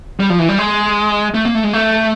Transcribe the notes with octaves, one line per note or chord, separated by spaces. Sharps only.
G3
F3
E3
G3
G#3
A3
A#3
A3
G#3
A3